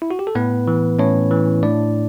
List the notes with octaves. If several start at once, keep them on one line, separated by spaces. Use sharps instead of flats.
E4
F#4
G4
A4
A2 B3 B4
E3
A2 C#4 C#5
E3
A2 D4 D5